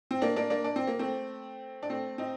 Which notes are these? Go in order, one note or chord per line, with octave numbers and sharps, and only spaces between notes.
C4
A#3 D4
A#3 D4
A#3 D4
D4
C4
A#3
A3 C4
D4
A3 C4
C4 D#4